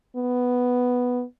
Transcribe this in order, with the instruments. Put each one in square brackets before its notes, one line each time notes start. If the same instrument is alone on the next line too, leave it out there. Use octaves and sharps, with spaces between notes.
[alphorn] B3